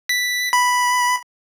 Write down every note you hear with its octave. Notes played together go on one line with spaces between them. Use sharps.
B6
B5